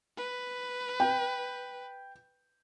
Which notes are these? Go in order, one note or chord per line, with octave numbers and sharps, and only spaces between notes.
B4
G5